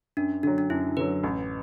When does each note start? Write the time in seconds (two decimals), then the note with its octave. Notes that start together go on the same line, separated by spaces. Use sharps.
0.17 F#2 D4
0.43 D3 F#3 D4
0.58 D4
0.70 F#2 E4
0.97 D3 F#3 B4
1.24 A1